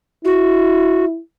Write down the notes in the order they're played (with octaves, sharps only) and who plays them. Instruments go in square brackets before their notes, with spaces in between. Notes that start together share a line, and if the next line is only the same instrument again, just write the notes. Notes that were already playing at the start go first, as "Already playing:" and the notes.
[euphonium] E4 [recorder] F#4